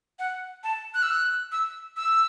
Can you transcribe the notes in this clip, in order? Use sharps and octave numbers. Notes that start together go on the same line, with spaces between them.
F#5
A5
F#6
E6
F#6
E6
E6